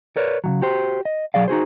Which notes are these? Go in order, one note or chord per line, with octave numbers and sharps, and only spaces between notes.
A#4 B4 C#5 D5
C#3 E3 F#3
F#4 G4 C5
D#5
B1 F#3 G#4 D5 F5
D#4 F#4 G#4 C5